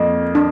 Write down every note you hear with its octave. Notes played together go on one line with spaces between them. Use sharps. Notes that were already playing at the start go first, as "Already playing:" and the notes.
Already playing: F2 A#3
D4